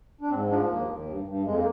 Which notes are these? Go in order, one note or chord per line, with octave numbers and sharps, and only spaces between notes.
D4
G#2 C4
F3 D4
D#2 A#3
D#2
G2
G2
F2 G#3
A#3